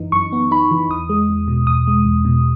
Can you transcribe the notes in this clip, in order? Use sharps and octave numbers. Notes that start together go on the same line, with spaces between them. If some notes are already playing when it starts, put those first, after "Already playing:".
Already playing: F#2 E3 D#4
F#2 C#6
B3
D#4 B5
E3
E2 D#6
G#3
E2
B2
E2 D#6
G#3
E2
B2